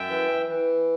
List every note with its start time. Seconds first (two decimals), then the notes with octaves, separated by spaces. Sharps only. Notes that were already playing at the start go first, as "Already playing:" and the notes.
Already playing: F#2 E5 G5
0.10 E3
0.48 E3